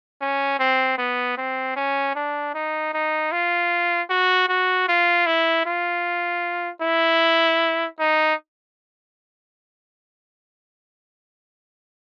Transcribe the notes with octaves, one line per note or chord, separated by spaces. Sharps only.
C#4
C4
B3
C4
C#4
D4
D#4
D#4
F4
F#4
F#4
F4
E4
F4
E4
D#4